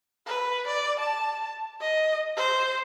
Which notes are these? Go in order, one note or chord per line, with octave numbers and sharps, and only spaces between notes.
B4
D5
A5
D#5
C5